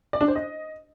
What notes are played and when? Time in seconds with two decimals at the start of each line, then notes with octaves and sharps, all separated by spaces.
0.13 D5
0.21 D4
0.28 C5
0.35 D#5